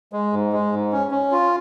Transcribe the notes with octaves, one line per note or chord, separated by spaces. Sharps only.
G#3
G#2
G#3
G#2
C#4
C#4
F4